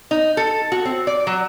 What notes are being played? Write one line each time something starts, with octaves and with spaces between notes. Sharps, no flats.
D#4
A4
F#4
C4
D5
F#3